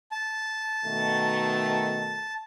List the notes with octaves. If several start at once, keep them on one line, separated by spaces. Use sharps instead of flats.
A5
B2 D#3 A3